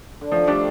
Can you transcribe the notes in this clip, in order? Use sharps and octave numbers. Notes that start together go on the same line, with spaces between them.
D3
D#3 F3
G3 A3 D4 G4